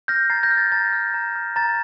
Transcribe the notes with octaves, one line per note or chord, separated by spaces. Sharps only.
F6 G6 A#6
A#5 A6 C7
G6 A#6
F6
A6
A#5 A6
F6
A#5
F6
A#5 A6